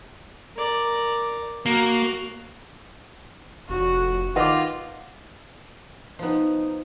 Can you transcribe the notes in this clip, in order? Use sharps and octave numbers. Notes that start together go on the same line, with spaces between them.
A#4 D5
A#3 F#4
F1 F#4
D#3 F4 B4 D#5 F#5 D6
F3 B3 D#4